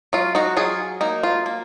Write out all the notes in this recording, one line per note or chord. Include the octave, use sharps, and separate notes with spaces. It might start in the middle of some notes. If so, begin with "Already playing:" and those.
F#3 F4
D#4 F#4
F#3 F4 G#4
A#3 D#4
F4
A#3